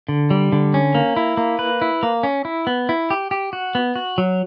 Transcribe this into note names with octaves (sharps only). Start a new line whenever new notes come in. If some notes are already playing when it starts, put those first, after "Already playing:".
D3
G3
D3
C#4
A#3
E4
A#3
B4
E4
A#3
C#4
E4
B3
E4
G4
G4
F#4
B3
F#4
F#3